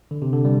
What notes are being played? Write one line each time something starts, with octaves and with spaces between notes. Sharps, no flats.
D3
C3
D3
G3